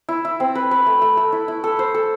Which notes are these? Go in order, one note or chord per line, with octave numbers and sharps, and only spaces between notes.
E4
E4
C4
B4
B4
A3
A3
A3
E4
E4
A4
C5
A4